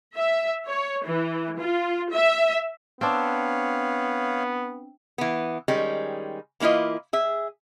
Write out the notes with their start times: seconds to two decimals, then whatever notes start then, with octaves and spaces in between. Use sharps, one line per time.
0.16 E5
0.67 C#5
1.04 E3
1.60 F4
2.12 E5
3.01 B3 C4 D4 C#5 F5
5.18 E3 B3
5.68 D#3 G3 G#3 C#4
6.60 E3 A#3 E4 F4 D#5
7.13 G#4 E5